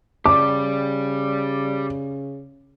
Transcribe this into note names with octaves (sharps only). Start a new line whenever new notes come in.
C#3 G4 D5 D6